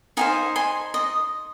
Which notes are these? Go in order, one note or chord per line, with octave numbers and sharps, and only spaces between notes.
D#4 G4 C5 F5 G#5
G#5 C6
D#5